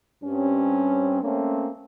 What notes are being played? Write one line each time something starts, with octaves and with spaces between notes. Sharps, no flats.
G2 G3 C4 C#4
A3 A#3 C4 C#4